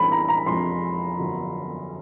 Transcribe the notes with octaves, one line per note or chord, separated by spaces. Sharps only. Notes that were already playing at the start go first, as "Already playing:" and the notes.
Already playing: A1 G2 E3 G#3 C4 B5
A#5
A#5
F2 C3 F3 G#3 C6
G1 F#2 D3 F3